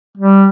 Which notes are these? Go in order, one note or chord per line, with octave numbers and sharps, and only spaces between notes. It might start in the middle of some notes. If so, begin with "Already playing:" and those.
G3